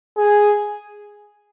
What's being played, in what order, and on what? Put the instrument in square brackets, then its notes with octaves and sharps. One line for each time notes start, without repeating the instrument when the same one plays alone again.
[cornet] G#4